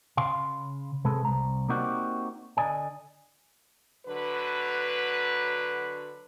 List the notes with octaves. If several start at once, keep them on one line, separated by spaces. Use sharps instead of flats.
C#3 F5 C6
C3 G#3 A4 B4
C2 A#5
A#3 C4 D#4 F#4 G4 D5
D3 D5 D#5 G#5
D3 F#3 B4